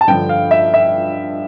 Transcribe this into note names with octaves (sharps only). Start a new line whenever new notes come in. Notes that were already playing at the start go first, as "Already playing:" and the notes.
A5
G2 D3 F3 G5
F5
E5
E5